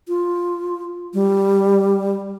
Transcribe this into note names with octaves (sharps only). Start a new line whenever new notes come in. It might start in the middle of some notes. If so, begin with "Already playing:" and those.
F4
G3